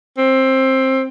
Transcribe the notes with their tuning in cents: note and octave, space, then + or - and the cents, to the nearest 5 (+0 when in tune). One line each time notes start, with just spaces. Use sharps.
C4 +15